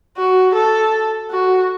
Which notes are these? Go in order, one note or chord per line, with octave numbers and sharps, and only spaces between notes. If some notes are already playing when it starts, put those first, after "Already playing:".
F#4
A4
F#4